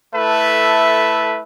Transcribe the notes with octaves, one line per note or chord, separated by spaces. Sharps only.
A3 E4 A4 B4 E5 A5